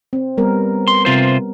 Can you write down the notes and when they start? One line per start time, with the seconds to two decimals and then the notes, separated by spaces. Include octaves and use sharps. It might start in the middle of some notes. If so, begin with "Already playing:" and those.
0.13 C4
0.37 G3 B3 A#4
0.88 C6
1.05 C3 F4 C5